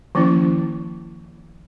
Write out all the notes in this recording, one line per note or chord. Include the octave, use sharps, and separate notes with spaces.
D#3 F3 A#3 C#4 E4